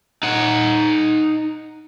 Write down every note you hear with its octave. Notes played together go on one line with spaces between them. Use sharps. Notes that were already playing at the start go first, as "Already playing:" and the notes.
D#4 F#5